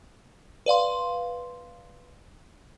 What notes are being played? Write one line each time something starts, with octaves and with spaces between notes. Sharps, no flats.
B4 D5 F5 C6